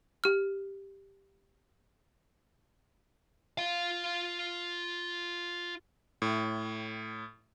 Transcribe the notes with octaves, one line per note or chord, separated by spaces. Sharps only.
G4 F6
F4 F5
A2